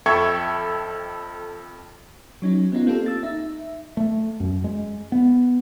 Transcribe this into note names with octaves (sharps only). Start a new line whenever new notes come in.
F2 A4 E5 G5 C#6 G#6
F#3 C#4 D#4
B3 C#4 D#4 F4
A#3 C4 F4 G4 A4
E6 A6
D#4 E5
A3
F#2
G#3
B3